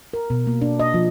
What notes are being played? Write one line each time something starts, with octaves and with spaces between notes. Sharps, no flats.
A#4
B2
A#3
D4
D#5
F3